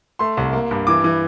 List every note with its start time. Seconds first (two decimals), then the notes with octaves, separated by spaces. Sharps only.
0.19 A3 C6
0.37 C2
0.53 A#3
0.71 G2
0.87 E3 D6
1.04 E3